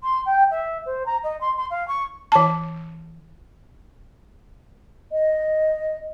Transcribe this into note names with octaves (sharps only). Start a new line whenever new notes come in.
C6
G5
E5
C5
A#5
D#5
C6
C6
F5
C#6
E3 A5
D#5